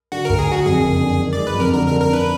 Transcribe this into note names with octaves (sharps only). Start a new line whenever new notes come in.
D3 F#4
D2 A#4
G#4
D3 F#4
F2 G#4
F#1
D3
D#3
G#3 D5
B4
F2 A#4
D3 A#4
A#4
D3
A#4
D4 B4